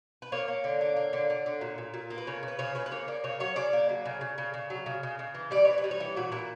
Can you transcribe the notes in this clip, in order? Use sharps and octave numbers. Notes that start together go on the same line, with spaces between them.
B4
A#3 C#5
A#3
D3
A#3
A#3
D3
D3
D3
A#2
A#2
A#2
A#3
B4
C#3 C#5
C#3
B4
C#3 C#5
C#3 B4
B4
A#3 C#5
A#3 D5
C#3 C#5
F#3 C#5
C#3 D5
A#3
F#3
C#3
C#3
C#3
C#3
F#3
C#3
C#3
C#3
E3
G3 D5
E3 C#5
B4
G3
C#5
E3
A#2 F#4
A#2 E4